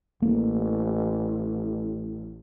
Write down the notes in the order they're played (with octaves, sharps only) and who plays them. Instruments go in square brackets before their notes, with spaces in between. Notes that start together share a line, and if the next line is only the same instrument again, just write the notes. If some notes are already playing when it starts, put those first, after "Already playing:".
[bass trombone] A1 [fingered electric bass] A#3